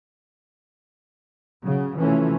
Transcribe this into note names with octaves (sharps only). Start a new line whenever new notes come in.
C#3 F#3
C3 E3 F3 A3 C#4